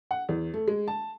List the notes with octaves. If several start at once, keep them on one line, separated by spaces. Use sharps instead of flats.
F#5
E2
A3
G#3
A5